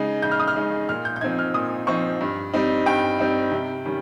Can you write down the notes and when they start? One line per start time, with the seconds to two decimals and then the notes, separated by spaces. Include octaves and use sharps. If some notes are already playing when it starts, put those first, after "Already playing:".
Already playing: C#3 G#3 D#4
0.22 C#3 G6
0.31 F6
0.39 D#6
0.47 F6
0.56 G#3 D#4
0.89 A#2 F6
1.05 G6
1.16 G6
1.21 F3 C4 D#4 G#6
1.39 F6
1.54 A#2 D#6
1.87 F3 C4 D#4 C#6
2.21 G2
2.54 G3 C4 D#4
2.86 G2 G5
3.19 G3 C4 D#4
3.52 C3
3.85 D#3 G3 C#4